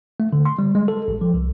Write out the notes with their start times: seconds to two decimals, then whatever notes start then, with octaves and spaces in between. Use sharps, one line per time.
0.20 A3
0.33 D3
0.45 C6
0.59 G3
0.75 G#3
0.88 A4
1.08 A1
1.21 F3
1.34 C2